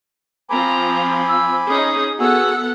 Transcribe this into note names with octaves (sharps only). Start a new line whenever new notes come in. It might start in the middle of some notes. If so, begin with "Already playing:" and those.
F3 C4 F4 G#5 A#5 B5 D6
E6
C#4 D#4 G#4 D#6
B3 F#4 G#4 A4 F#5 G#5 E6